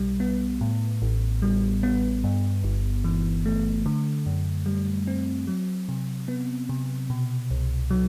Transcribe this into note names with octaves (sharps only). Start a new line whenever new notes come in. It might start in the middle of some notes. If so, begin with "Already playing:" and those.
Already playing: B1 B2 G3
B3
A2
A1
G3
B3
G2
G1
E3
A3
D3
F#2
G3
C4
F#3
C3
B3
C3
B2
C2
F#3